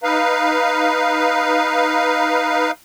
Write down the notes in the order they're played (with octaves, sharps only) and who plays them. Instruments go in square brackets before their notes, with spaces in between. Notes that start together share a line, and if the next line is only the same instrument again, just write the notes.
[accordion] D#4 B4 F5